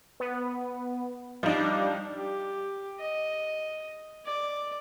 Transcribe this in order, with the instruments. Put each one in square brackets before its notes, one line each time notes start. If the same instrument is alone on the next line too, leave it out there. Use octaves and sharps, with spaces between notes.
[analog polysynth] B3
[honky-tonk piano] F3 D#4 [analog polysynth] G3 D4
[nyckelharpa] G4
D#5
D5